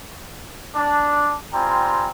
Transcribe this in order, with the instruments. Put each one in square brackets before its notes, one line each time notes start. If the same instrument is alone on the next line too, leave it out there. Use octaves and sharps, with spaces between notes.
[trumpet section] D4
G3 C4 F4 G#5 A#5